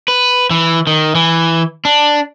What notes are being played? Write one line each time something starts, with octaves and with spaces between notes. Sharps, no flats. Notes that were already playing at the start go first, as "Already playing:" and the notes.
B4
E3
D#3
E3
D4